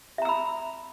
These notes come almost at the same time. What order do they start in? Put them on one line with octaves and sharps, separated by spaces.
E5 A#5 E6 B5